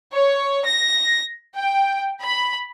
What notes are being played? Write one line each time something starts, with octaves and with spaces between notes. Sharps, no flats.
C#5
A#6
G5
B5